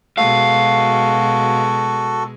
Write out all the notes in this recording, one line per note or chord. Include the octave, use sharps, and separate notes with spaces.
B2 G#3 F#4 A4 F5